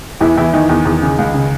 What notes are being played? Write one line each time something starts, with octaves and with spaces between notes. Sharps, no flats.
E2 E3 E4
E2 E3 E4
D#3 E3 D#4
E2
E2
C#3
C#2
C#3